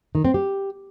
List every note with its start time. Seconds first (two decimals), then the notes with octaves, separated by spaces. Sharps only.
0.15 D#3
0.25 C4
0.34 G4